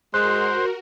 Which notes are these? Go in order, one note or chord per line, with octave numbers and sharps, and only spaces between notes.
G#3 F#4 A#4 C5 F#6